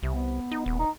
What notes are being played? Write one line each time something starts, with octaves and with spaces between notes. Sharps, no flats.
C2 C3
B3
D#4
D#1
D#4